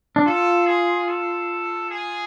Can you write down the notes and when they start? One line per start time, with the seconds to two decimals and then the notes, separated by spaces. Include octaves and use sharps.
0.16 D4
0.26 F4 A4
0.67 G#4
1.08 A4
1.90 G#4